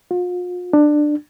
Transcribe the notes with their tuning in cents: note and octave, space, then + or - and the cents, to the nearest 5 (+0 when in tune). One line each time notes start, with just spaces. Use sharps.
F4 +40
D4 +15